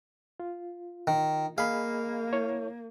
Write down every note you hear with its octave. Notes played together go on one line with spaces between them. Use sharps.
F4
D#3
A#3 G#4 D#5 F5 B5
E4 C#5